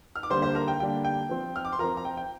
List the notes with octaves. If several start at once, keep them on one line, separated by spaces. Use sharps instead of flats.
F6
D6
D3 G3 A#3 D4 C5 C6
C5 C6
A#4 A#5
G5
D3 G3 A#3 D4 G5
G5
F3 C4
F6
D6
C6
F3 C4 A#4 A#5
A#5
G5
G5